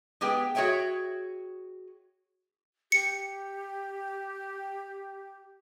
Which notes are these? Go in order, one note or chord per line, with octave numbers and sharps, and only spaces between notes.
G#3 B3 G4 G#4 G5
F#4 G#4 C#5 E5 G5
G4 C#7